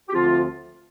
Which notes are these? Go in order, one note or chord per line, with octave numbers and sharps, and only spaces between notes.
G4
D2 D3 F3 C4 F4